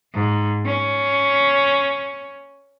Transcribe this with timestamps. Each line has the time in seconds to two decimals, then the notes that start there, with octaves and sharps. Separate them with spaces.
0.13 G#2
0.66 C#4